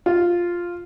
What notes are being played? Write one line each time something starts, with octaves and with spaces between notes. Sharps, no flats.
F4